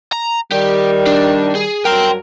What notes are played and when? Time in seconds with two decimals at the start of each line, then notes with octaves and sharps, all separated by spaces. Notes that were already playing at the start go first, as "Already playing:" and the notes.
0.13 A#5
0.52 D#3 G3 G4
1.07 D4
1.55 G#4
1.85 G2 F#3 A#4 G5 C6